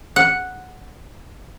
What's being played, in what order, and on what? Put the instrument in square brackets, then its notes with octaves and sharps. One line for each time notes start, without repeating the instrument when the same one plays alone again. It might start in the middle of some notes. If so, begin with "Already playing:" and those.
[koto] F#5